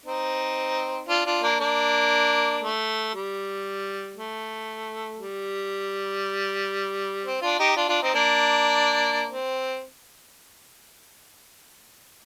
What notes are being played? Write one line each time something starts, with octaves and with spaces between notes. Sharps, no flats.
C4 D#4
D4 F4
D4 F4
A#3 D4
A#3 D4
A3
G3
A3
G3
C4
D4 F4
D#4 G4
D4 F4
D4 F4
C4 D#4
A#3 D4
C4